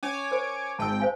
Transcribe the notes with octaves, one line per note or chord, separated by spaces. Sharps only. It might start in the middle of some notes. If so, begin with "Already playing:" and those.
C#4 C#5 G#5 D6
A#4 C5
G#1 G#2 G5 A5 E6
C5 F5 G#5